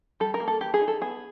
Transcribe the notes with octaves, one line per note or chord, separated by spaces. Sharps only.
G3 A4
A#4
A#3
A4
E3 G4
G#4
D#4
A4
B3 G#4